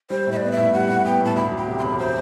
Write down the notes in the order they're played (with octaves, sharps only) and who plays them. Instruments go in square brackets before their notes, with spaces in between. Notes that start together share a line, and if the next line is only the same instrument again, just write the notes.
[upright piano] G3 [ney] C5
[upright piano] A2
[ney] E5
D5
[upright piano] B3
[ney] E5
[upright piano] A2
[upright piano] G3 [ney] F#5
[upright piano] A2
[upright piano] B3 [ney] G5
[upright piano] A2 [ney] A5
[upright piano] D2 [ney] B5
[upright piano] F#3
[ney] G5
[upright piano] C3
[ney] C6
[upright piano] E1 [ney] B5
[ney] C5